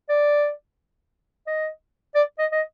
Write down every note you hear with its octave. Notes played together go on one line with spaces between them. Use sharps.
D5
D#5
D5
D#5
D#5